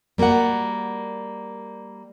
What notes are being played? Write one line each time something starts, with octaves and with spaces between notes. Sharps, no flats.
G3 A#3 F#4 A#4 F#5